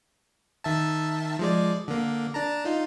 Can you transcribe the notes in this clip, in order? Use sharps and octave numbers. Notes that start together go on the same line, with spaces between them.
D#3 E5 A5
F3 G#3 D5
D3 A#3
D4 A5 A#5
D#4 F4